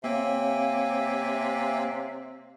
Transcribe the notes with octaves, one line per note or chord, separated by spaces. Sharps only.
C3 A#3 C4 C#5 E5 F5 G5 G#5